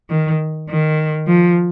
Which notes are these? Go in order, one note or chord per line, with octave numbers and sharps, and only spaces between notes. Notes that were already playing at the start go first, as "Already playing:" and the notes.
D#3
D#3
F3